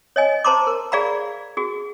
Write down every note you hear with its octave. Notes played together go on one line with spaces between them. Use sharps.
C#5 D#5 G#5
C5 A5 A#5 C6 D6
A#4
G#4 D5 F5 A#5 B5
F#4 G#4